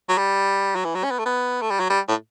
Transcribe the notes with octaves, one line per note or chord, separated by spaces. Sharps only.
F#3
G3
F#3
E3
F#3
C#4
B3
A3
B3
A3
G3
F#3
G3
A2